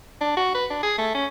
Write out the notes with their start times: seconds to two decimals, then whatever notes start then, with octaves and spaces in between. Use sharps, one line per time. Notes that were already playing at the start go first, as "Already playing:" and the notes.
0.21 D4
0.37 F#4
0.55 B4
0.70 D4
0.83 G#4
0.98 A3
1.15 C#4